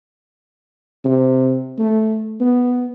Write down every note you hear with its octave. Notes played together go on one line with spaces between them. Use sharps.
C3
A3
B3